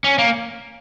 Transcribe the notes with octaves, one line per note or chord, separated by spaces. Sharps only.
C#4
A#3